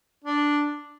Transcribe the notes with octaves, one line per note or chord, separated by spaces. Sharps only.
D4